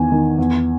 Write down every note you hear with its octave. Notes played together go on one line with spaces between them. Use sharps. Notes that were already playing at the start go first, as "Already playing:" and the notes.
Already playing: E2 D#3 G#5
D#3
E2